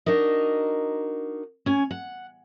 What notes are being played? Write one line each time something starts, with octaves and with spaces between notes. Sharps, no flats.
D4 D#4 F#4 A#4 D#5
C#4 G#5
F#5